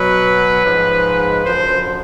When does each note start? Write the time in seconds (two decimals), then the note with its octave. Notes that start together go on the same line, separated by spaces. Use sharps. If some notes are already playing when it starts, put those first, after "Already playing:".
Already playing: B2 F#3 B4
0.65 G#2 F3
1.45 F#2 D3 F3 C5